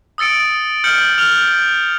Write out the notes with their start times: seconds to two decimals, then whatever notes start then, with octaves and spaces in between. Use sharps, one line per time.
0.18 D#6 E6 A6 C#7 D7
0.84 F6 G6 C#7 F#7
1.18 F6 F7 G7